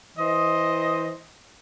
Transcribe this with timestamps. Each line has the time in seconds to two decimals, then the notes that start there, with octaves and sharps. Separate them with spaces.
0.18 E3 C5 D#5